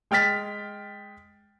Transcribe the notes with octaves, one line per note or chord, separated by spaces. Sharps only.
G#3 G5 F6 A6 B6